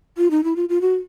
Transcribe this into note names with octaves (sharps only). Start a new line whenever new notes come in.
F4
D#4
E4
F4
F4
F#4